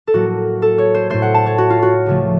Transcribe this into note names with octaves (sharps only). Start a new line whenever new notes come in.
A4
A2 F#3 A#3 F#4
A4
C#5
C5
A2 A3 C5
F#5
A5
C#5
F#4
F4
F#4
C#2 C#3 F3 A3